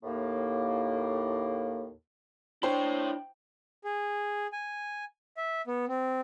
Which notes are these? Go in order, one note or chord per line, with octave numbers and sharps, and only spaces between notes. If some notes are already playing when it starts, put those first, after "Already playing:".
D#2 A2 A#3
D4 E4 C5 C#5 G5
G#4
G#5
E5
B3
C4